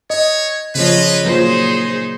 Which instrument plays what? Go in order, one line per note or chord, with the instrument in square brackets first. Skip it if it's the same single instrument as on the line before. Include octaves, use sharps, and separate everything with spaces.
[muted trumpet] C#5 [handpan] D#5
[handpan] C#3 [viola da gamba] F3 C#5 D#5 [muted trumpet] B4
[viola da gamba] A#2 G#4 C5 [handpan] F#3 F4 [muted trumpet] D#4